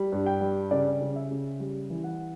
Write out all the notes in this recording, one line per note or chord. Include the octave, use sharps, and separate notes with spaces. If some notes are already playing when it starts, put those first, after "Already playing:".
Already playing: G3
G2
G5
G3
C#3 D5
C#3
E5
C#3
G3
E3
F#5